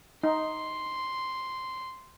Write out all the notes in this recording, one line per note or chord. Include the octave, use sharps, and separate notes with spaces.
D#4 C6